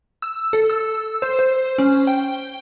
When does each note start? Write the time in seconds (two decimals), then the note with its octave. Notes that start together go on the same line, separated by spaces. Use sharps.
0.22 E6
0.53 A4
0.70 E6
1.22 C5
1.39 C5
1.78 C#4
2.07 G5